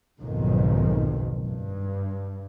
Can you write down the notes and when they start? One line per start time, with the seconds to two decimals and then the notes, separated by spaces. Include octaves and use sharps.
0.21 F#1 B1 F2 G#2 D#3
1.47 G2